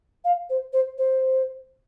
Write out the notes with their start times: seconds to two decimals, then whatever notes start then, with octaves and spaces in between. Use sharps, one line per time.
0.24 F5
0.50 C5
0.73 C5
0.98 C5